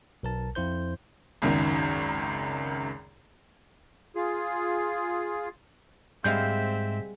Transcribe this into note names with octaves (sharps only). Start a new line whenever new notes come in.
B1 A#4 A5
F2 E4 C5 G6
G#1 C#2 F#2 D#3
F4 G#4
G#2 G3 G#3 C4 E5 F5 G6